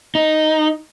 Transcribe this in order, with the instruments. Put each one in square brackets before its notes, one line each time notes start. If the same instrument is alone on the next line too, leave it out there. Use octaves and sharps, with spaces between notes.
[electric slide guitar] D#4